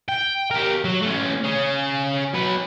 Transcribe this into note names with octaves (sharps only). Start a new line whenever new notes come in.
G5
G4 A#4
F#3
A3 C#4
C#4 G#4
F#3 B4